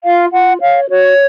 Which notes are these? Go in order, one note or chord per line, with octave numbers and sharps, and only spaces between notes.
F4 F5
F4 F#5
C#5 F5
F#4 C#5